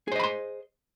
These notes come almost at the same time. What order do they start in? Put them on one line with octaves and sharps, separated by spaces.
G#4 C5 D#5 B5 C6